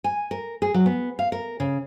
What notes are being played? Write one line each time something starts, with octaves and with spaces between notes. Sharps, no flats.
G#5
A#4
G#4
F#3
B3
F5
A#4
C#3